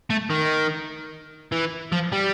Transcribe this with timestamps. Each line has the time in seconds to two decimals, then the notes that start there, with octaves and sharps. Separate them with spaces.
0.10 A3
0.30 D#3
1.52 E3
1.92 F3
2.12 G3